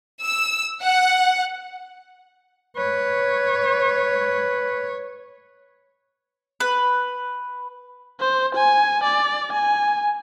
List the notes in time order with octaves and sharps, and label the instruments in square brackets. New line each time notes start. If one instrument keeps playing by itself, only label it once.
[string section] E6
F#5
[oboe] B4 [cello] C#5
[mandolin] B4
[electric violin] C5
G#5
D5
G#5